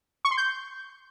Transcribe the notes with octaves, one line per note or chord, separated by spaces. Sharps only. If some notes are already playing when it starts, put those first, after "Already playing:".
C#6
C6
G6